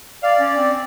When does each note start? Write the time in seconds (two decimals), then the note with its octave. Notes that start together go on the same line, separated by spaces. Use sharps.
0.23 D5 F5
0.40 C#4
0.57 C4